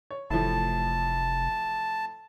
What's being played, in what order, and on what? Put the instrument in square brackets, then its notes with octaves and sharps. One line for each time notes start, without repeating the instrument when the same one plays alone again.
[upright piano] C#5
[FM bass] F1 [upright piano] A2 E3 F3 [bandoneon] A5